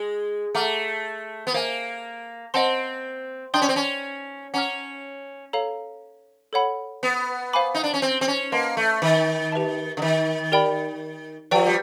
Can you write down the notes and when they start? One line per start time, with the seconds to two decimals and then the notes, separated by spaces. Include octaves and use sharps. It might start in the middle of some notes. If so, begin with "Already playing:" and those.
Already playing: G#3
0.55 A3 F#5 A#5 D6 F6
1.47 B3
1.54 A#3 C5 E5 G#5
2.54 C4 C5 D#5 F#5 A5 C6
3.54 D4 D5 G5 C6 D#6 G6
3.62 C#4
3.69 C4
3.76 C#4
4.54 C#4 F#5 A#5 D6 F6
5.53 A4 C#5 F5 A#5
6.53 A4 C#5 F#5 B5
7.03 B3
7.53 C5 F5 G#5 B5 D6
7.75 D#4
7.84 D4
7.94 C#4
8.02 C4
8.21 C4
8.28 C#4
8.52 A#3 B4 D#5 F#5 A5 C6
8.77 A3
9.02 D#3
9.52 G4 B4 E5 A5
9.97 D3
10.02 D#3
10.52 G4 A#4 D5 G5 B5
11.51 F3 G4 B4 D5 G5
11.67 G3